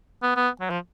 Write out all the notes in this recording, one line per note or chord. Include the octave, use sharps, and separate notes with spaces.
B3
B3
F#3
F3